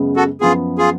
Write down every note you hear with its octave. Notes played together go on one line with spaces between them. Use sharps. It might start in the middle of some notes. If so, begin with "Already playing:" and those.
Already playing: F#2 C#3 G#3 B3
F#4 A4
F#2 F3 B3 F4 G#4
F4 G#4